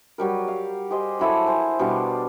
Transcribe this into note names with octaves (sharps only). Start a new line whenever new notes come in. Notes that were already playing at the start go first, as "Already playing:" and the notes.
F#3 G3 A#4
F5
G4 G#4 C5 D#5
F#3 E4 A4
G#4 C5 G#5
B2 G3 D4 F5